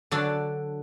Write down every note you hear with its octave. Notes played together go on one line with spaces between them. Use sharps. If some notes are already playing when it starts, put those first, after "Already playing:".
D3 F#3 D4 F#4 A4